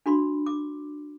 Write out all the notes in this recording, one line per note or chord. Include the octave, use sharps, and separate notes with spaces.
D4 F#4 B5 C6
D6